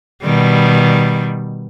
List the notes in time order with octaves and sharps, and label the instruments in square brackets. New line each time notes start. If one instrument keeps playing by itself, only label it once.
[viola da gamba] B2 D#3 G3